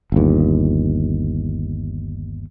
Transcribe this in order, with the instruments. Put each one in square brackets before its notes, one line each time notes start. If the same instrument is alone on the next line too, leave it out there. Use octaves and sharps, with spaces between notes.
[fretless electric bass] G1 D#2